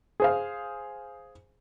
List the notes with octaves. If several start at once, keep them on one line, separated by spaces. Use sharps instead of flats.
G#4 C5 F5